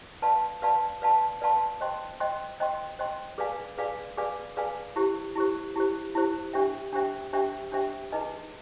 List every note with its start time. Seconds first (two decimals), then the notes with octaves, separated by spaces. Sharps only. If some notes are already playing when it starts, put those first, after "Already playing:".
0.22 B4 D5 F5 A5 C6
0.62 B4 D5 F5 A5 C6
1.02 B4 D5 F5 A5 C6
1.41 B4 D5 F5 A5 C6
1.81 C5 D#5 G5 C6
2.20 C5 D#5 G5 C6
2.60 C5 D#5 G5 C6
2.99 C5 D#5 G5 C6
3.38 G#4 B4 D5 F5 G#5
3.78 G#4 B4 D5 F5 G#5
4.18 G#4 B4 D5 F5 G#5
4.57 G#4 B4 D5 F5 G#5
4.96 E4 G4 C5
5.35 E4 G4 C5
5.76 E4 G4 C5
6.15 E4 G4 C5
6.53 D4 G4 C5 E5 G5
6.93 D4 G4 C5 E5 G5
7.33 D4 G4 C5 E5 G5
7.72 D4 G4 C5 E5 G5
8.12 D#4 G#4 B4 D#5 G#5